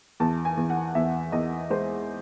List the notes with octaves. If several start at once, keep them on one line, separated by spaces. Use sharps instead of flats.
E2 A5
G#5
E2
F#5
E2 E5
E2 D#5
G#3 C5